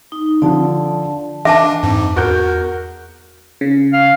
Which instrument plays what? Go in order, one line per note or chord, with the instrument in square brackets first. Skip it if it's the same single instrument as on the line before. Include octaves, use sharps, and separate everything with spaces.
[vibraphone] D#4
[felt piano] D3 F3 [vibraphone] D5 A5
[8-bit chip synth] E3 D4 [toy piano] E5 A5 [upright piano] D6
[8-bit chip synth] F2 G#2
[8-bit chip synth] E2 [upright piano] F#4 A#4 G6
[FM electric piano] C#3
[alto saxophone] F5